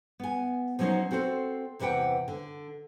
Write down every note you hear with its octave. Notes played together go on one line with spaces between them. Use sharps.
B3 G#5
F3 F#3 A#3 C#4 D#4 C5
C4 F#4 A4 B4 C5
E2 C3 E3 B4 F#5 G5
D3